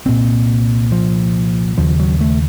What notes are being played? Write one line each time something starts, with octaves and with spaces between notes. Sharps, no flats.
C2 A#2 C4
F3
D#2 C#3 F3
F#3
A3